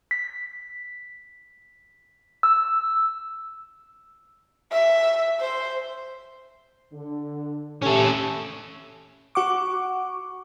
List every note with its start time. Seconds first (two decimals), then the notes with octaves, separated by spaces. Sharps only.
0.11 B6
2.43 E6
4.72 E5
5.40 C5
6.93 D3
7.83 A3 C#4 G4 A4
9.35 F#4 F#5 C#6 D6